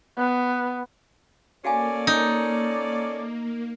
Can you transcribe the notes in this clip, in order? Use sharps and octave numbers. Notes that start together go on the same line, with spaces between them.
B3
A#3 C#4 F#4 A4 D5 F5 G#5
D#4